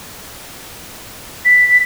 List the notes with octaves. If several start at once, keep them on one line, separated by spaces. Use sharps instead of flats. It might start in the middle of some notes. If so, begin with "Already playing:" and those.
B6